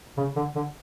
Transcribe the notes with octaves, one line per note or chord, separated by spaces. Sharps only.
C#3
D3
D3